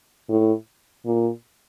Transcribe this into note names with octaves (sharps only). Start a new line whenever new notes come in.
A2
A#2